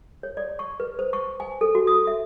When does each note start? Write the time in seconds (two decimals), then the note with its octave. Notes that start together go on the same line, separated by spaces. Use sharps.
0.23 C#5
0.37 D5
0.59 C#6
0.80 B4
0.99 C5
1.13 C#6
1.40 G#5
1.61 A4
1.75 F#4
1.87 D#6
2.07 E5